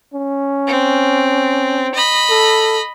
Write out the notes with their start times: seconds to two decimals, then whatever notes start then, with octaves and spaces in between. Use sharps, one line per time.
0.14 C#4
0.67 C4
1.95 D#5 B5
2.30 A4